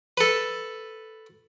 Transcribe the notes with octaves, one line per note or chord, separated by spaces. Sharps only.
A4 B4